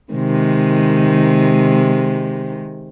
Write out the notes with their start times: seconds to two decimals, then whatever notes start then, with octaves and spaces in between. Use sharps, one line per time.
0.13 C3 D#3 G#3